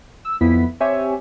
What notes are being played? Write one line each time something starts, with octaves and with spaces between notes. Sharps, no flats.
E6
F2 B3 E4 B6
C4 G4 C#5 E5 G#5